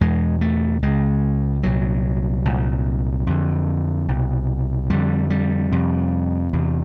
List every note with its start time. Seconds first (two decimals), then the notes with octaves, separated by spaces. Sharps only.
0.01 E2 B2 G#3
0.41 A3
0.82 C#2 C#3 G#3
1.63 C2 A#2 F#3
2.45 C2 A#2
3.27 F2 D3
4.08 C2 B2
4.90 F2 D3 G3
5.30 G3
5.72 F2 C3
6.53 E2 C3